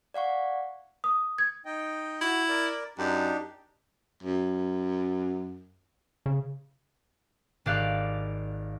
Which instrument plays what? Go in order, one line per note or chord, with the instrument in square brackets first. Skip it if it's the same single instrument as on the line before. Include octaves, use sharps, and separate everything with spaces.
[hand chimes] D5 F5 F#5 C#6
[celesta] D#6
G#6
[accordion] D#4 D#5 G5
[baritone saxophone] E4 [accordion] F#4
[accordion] A#4 D5
[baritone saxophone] F#2 [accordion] D4 D#4 G4
[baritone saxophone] F#2
[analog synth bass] C#3
[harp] G#1 G4 D5 F5 F#6